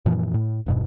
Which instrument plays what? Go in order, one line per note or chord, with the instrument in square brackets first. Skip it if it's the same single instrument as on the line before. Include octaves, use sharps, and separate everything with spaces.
[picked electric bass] F#2 A#2 E3 F3
A2
E1 G2 B2